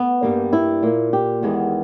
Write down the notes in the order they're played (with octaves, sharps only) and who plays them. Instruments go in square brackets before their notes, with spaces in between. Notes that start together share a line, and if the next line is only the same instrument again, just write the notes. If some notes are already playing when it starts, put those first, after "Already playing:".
Already playing: [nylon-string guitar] B3
G2 G3 A#3
E4
A#2 A#3
G4
E2 D#3 G#3 B3